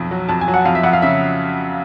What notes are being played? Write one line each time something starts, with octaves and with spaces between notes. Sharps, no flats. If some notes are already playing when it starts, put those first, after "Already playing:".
Already playing: B1 F2
F#3
F2 A5
G#5
F#3
F#5
F2 F5
E5
F2 F#5
F5
C#3 E5